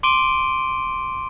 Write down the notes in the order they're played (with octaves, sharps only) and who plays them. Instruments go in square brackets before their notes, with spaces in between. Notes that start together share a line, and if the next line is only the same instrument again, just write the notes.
[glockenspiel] C6 D6 D7 D#7 G7